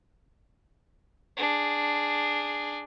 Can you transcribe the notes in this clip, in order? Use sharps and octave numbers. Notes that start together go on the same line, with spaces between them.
D4 G#4